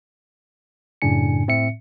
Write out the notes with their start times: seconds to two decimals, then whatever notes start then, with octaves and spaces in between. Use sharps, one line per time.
1.02 F#2 A2 C#3 D4 G#5 C#7
1.48 A2 C4 E5 C#7